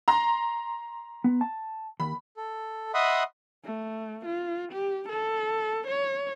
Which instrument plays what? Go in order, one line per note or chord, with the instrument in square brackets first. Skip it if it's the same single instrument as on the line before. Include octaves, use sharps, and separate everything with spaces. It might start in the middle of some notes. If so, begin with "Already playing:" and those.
[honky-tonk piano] A#5 C6
[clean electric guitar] B3
A5
[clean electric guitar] D#2 [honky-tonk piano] B5
[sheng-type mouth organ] A4
D#5 E5 F#5 B5 C6 D#6
[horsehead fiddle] A3
F4
G4
A4
C#5